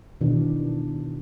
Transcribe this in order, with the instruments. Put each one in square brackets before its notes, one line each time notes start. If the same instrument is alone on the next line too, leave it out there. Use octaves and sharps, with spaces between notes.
[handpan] B2 D#3 E3 D4